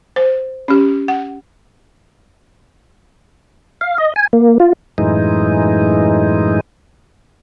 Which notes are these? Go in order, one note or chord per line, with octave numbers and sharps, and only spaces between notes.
C5
C#4 G4
F#5
F5
D#5
G#5
A#3
F4
F#2 A2 E3 G#3 D#4